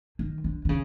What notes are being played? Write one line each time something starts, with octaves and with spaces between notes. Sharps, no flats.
D#3
D3
D3
C#3